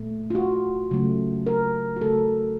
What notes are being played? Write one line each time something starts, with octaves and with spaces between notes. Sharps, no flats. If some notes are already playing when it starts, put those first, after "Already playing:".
Already playing: A#2 A3
F4
F#4
C#3 F#3 A3
A#4
F#4
C#3 A3 A4